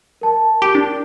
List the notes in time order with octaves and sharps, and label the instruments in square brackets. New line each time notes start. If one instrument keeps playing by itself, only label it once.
[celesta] A#4 A5
[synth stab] G4
D4